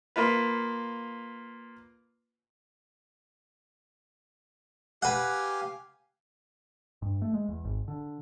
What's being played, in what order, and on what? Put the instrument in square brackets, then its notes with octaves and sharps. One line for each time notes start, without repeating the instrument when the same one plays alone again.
[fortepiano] A#3 F4 B4
[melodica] G4 F5 G#5 [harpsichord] B4 F#5
[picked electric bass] G2
A3
G#3
E2
G#1
D3